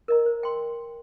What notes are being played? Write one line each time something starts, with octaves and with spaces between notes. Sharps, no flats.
A#4 D#5 A#5
C5
G5 C6